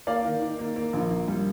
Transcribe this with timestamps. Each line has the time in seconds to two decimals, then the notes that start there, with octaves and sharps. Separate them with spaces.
0.07 A#3 D5 F5
0.24 D#3
0.42 D#3
0.59 A#3
0.76 A#3
0.93 A#1
1.10 A#3
1.28 G3